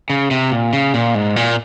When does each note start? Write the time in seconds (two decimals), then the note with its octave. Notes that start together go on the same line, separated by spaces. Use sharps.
0.10 C#3
0.31 C3
0.52 A#2
0.73 C#3
0.94 A#2
1.15 G#2
1.36 A#2